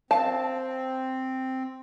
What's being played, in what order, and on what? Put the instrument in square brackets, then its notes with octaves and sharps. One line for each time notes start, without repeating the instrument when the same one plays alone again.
[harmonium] C4 [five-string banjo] F5 A5